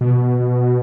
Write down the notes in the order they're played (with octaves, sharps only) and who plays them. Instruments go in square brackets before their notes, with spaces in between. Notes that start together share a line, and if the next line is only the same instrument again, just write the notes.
[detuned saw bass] B2